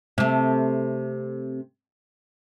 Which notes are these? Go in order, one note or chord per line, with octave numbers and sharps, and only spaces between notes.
C3 A3